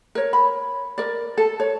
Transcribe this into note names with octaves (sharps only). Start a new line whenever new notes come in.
A#4 C#5
B5
A#4 D5
A4
C#5